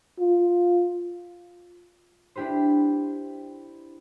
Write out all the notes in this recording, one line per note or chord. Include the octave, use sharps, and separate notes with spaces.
F4
D4 E4 G4 B4 C5